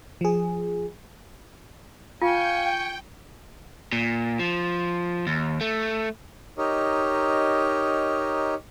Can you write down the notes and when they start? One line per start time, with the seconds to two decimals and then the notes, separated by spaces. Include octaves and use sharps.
0.21 F3 G#4
2.22 F4 F5 G5 G#5 C#6
3.93 A#2
4.39 F3
5.27 D#2
5.61 A3
6.58 D#4 G4 A#4 C#5 D#5